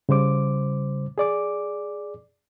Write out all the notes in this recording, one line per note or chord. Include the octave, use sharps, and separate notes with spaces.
C#3 G3 C5 D6
G#4 D5 D6